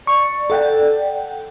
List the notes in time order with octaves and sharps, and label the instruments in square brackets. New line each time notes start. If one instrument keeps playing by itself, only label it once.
[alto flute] D5 [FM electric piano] C#6
[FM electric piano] A4 F#5 G5